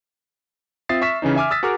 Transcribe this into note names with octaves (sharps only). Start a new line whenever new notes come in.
C4 F4 E5 D#6 A6 C7
E5 C#6 F6 B6 E7
C#3 E3 C#4 D#4
E5 G#5 D6 F6
D#6 E6 A6 B6
F#4 G#4 A#4 D6 F6